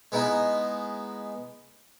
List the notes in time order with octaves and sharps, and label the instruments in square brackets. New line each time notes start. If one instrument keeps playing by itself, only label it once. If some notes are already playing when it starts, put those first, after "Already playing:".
[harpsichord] G#3 B3 D#4 E4